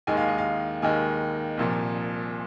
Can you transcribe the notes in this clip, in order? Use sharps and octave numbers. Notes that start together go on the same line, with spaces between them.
D#2 D#3 G#3 G#5
F5
D#5
F5
D#2 D#3 G#3 G#5
C2 A#2 F3